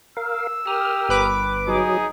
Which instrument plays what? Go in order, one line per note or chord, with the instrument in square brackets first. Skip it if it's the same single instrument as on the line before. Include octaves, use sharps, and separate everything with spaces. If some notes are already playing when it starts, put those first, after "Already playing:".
[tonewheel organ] A#4 F5 [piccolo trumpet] E6
[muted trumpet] G4 [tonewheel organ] A#4 D#6 F6
[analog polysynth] G1 B4 D6
[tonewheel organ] F#3 [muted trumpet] D#4 [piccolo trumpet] G#4